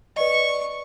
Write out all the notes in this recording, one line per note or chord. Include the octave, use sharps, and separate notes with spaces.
B4 D5 D#5 C#6